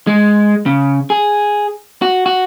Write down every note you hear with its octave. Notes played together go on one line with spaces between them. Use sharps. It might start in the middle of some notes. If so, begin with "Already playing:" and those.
G#3
C#3
G#4
F#4
F#4